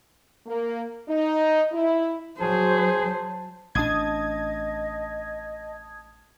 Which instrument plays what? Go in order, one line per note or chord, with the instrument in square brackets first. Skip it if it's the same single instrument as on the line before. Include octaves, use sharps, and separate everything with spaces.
[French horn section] A#3
D#4
E4
[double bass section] F#3 [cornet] G#4 [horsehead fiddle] C5 [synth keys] A5
[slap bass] A1 D4 [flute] D#5 [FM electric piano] A5 D#6 G#6